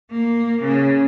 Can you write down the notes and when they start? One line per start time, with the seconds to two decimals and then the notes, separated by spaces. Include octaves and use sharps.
0.11 A#3
0.61 C#3